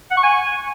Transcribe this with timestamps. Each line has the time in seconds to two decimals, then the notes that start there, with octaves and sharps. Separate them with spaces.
0.11 F#5
0.17 C#6
0.24 G#5